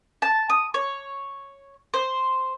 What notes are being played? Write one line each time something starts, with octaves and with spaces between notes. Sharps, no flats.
A5
D#6
C#5
C5